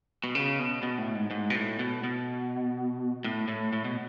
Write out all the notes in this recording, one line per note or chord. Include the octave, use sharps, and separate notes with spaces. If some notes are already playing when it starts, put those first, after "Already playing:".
B2
C#3
B2
B2
A2
G#2
G#2
B2
A2
B2
B2
A2
A2
A2
B2